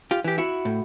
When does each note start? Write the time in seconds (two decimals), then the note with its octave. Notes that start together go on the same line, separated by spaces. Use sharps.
0.11 F4 G4
0.24 E3 G4
0.38 E4 F#4
0.65 A2